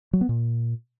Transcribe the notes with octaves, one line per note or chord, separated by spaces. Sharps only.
F#3
B3
A#2